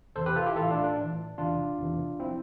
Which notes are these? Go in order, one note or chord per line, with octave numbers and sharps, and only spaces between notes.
E2 C3 E3 A4 C5
G4 B4
F4 A4
E4 G4
A2 E3 F4 A4
D4 F4
D4
A2 E3
E2 C3 E3 D4 F4
E2 C3 E3
F3 C4 E4